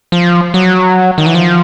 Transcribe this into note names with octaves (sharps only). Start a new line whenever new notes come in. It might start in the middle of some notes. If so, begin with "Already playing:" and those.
F3
F#3
D#3
E3
F3